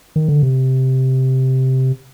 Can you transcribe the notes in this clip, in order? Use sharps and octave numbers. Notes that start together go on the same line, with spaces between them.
D#3
D3
C3